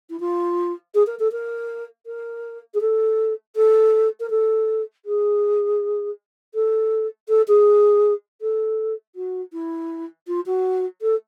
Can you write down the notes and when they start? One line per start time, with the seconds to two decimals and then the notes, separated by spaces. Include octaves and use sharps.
0.09 E4
0.19 F4
0.94 G#4
1.06 A#4
1.19 A4
1.31 A#4
2.06 A#4
2.74 G#4
2.80 A4
3.56 A4
4.20 A#4
4.30 A4
5.05 G#4
6.54 A4
7.28 A4
7.47 G#4
8.41 A4
9.15 F#4
9.52 E4
10.27 F4
10.46 F#4
11.01 A4